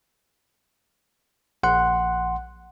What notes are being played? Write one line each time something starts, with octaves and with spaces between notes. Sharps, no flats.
A#1 F#5 C6 F#6